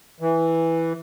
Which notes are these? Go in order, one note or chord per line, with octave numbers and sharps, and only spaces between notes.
E3